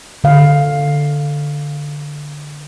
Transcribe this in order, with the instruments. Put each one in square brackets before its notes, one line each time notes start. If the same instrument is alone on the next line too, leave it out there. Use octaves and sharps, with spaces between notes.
[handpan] D3 F5